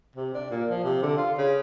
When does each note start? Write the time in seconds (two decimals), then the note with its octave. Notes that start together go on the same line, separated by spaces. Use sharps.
0.16 C3
0.34 D4
0.51 A#2
0.70 F3
0.84 C3
1.03 D3
1.17 F4
1.38 C#3